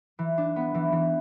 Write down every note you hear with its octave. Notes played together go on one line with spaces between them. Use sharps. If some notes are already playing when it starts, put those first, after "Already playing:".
E3
D4
B3
E3
E3